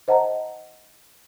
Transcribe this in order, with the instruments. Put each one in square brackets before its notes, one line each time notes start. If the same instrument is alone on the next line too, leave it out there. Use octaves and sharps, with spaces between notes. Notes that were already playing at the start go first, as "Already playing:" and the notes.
[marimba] C5 D#5 F#5 A5 A#5